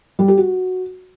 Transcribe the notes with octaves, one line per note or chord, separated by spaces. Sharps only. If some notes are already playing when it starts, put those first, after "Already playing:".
G3
G4
F#4